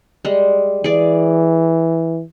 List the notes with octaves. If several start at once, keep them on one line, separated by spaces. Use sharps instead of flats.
G3 G#3
E3 G#4 D5